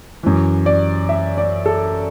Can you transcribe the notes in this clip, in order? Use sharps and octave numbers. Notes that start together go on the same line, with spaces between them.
F#2 E3
D5
E5
D5
A4